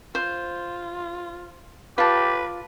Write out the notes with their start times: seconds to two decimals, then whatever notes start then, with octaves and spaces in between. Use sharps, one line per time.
0.15 F4 C5
1.98 F4 G4 B4 A5